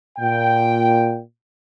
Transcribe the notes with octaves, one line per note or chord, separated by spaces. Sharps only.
A#2 G5